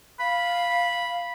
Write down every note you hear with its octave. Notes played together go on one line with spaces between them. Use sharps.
F5 B5